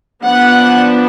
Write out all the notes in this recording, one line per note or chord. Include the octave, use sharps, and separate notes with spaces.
F3 B3 D4 F#5